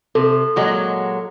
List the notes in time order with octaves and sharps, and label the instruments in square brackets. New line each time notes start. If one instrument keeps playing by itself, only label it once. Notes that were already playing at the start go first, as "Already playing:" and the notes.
[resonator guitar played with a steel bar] C3 [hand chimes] A4
[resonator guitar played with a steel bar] A#2 F#3 G#3